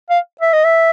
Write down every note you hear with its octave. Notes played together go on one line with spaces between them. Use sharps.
F5
E5
D#5
E5